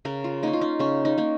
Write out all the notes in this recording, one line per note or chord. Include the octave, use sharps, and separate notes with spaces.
C#3 A#4
F4
A#3 C#4 D#4
F4
D#4
C#3 C#4
D#4
A#3 C#4